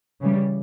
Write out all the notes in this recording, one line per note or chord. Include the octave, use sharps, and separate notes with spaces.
C#3 E3 G3